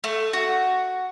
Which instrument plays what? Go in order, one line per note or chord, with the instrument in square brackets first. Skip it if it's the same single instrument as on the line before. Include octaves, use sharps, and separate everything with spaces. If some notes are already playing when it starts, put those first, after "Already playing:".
[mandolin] A3
F#4